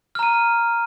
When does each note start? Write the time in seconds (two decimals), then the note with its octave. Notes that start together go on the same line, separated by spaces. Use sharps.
0.15 F6
0.19 A#5
0.23 D#7